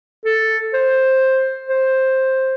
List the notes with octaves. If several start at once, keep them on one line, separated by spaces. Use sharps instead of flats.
A4
C5
C5